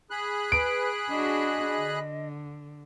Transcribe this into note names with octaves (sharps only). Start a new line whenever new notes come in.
G#4 B5 F#6
B4 D7
D4 F#4 D#5
D3